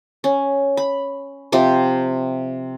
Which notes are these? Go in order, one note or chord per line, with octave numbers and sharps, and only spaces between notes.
C#4
B5
C3 F3 G4 G5